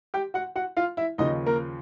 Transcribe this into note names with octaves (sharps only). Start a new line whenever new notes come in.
G4 G5
F#4 F#5
F#4 F#5
F4 F5
E4 E5
D#2 C#3 F3 D#4 D#5
A#3 A#4